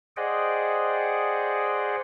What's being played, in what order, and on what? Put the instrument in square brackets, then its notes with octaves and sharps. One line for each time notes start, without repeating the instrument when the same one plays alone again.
[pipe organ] G#4 C5 D5 D#5 F#5 G5